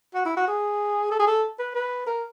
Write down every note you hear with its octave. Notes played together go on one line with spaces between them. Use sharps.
F#4
E4
F#4
G#4
A4
G#4
A4
B4
B4
A#4